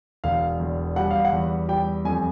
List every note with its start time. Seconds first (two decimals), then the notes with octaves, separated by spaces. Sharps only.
0.24 E1 F5
0.60 E2
0.96 G3 F#5
1.11 F5
1.25 F#5
1.32 E2
1.68 G3 G5
2.05 F2 G#5